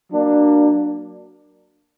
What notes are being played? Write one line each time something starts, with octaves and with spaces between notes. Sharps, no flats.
F#3 A#3 D4